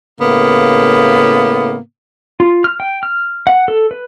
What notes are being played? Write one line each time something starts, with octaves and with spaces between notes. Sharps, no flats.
A2 C#3 A#3 B3
F4
F6
G5
F6
F#5
A4
B4